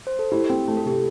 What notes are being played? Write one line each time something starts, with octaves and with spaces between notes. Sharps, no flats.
C5
A4
E4 G4
C4
A3
A4
C3 G4